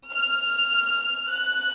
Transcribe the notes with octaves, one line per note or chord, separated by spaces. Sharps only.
F6
F#6